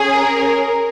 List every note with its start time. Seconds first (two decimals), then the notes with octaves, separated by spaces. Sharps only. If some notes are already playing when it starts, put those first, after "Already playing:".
Already playing: C#4 G#4
0.13 A#4